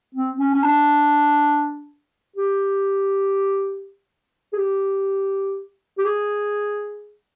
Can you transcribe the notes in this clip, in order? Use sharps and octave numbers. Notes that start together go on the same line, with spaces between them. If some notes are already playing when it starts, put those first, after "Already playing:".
C4
C#4
C#4
D4
G4
G#4
G4
G4
G#4